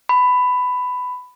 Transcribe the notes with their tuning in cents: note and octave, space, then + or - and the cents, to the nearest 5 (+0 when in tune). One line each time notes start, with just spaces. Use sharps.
B5 +15